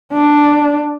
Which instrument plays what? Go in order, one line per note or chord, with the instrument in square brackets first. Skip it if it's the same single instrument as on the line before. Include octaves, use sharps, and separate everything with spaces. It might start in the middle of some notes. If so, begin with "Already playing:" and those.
[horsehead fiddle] D4